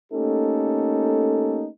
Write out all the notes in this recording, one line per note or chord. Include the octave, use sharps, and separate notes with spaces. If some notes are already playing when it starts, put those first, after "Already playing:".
A3 A#3 C#4 D#4 G4 A4